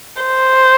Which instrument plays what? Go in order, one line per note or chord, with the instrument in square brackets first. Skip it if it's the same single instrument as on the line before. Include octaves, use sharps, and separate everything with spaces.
[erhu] C5